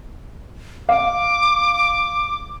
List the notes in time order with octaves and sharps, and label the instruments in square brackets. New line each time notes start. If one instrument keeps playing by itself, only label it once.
[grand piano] F5 [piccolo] D6